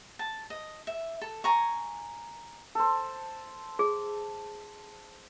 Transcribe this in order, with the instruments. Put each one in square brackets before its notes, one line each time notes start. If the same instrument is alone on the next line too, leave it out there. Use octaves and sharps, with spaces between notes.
[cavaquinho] A5
D#5
E5
A4
G#5 A#5 C#6
[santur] A4 C5
[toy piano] G#4